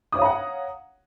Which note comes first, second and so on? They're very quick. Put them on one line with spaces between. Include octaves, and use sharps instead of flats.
D#6 C#5 F5 A#5 F#5